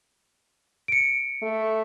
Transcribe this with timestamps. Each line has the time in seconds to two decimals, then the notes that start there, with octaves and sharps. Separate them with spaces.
0.88 C#7 D7
1.42 A3